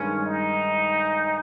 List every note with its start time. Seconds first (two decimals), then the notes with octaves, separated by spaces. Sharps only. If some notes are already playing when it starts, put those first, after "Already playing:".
Already playing: G2 D#3 G#3 C#4
0.26 D#4